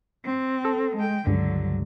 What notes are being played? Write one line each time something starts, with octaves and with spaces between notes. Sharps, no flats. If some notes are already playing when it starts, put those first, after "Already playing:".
C4
A4
G#3 G5
C#2 G2 D3 F#3